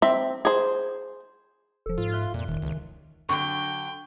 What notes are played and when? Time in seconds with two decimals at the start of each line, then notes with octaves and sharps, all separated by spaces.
0.02 C4 E5
0.45 G#4 C5
1.86 E1 F3 A4
1.98 G#2 F4
2.12 E5 F#6 G7
2.34 F2 A#2
2.48 D#1 D#3
2.62 C#2
3.29 D3 F#3 G5 C#6